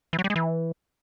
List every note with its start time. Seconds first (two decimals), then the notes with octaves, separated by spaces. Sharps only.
0.13 E3
0.19 F#3
0.24 G3
0.30 G#3
0.36 E3